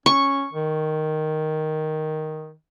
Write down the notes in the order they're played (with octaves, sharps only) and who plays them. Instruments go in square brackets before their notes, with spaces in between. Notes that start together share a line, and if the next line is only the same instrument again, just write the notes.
[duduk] C#4 [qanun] C#6
[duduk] D#3